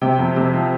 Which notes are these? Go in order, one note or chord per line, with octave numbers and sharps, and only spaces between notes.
C3 G5
F2
C3
F3